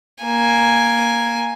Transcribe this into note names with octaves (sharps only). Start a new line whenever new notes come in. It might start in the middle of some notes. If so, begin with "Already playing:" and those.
A#3 G#5